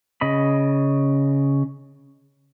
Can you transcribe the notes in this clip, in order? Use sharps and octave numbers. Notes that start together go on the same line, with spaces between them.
C#3 D#5 B5